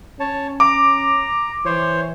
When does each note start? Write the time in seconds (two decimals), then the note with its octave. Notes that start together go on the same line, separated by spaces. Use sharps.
0.20 C#4 C#5 A5
0.60 A#5 D6
1.66 E3 C5 C#5